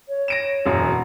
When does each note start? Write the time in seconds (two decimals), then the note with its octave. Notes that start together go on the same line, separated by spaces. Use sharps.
0.08 C#5
0.28 A#6 D7 E7
0.66 E1 F#2
0.89 B3